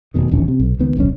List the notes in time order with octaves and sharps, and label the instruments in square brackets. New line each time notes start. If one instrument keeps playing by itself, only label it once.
[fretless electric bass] F1 C2 B2 D#3
E1 A#1 D#2 C#4
C3
B1
C#2 D#3 B3
D1 B1 C#4